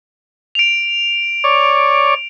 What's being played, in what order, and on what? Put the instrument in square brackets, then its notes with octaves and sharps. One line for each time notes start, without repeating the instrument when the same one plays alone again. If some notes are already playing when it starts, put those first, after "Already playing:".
[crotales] D7 F7
[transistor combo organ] C#5 D5